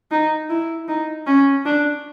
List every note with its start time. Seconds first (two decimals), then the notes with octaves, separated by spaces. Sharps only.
0.11 D#4
0.49 E4
0.88 D#4
1.27 C#4
1.65 D4